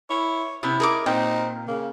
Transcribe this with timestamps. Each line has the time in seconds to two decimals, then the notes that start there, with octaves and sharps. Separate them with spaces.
0.10 E4 C#5
0.63 C3 B3 C#4 E4
0.80 D#4 G#4 A#4 C#5 D6
1.06 A#2 C4 D#4 G5
1.67 C#3 A#3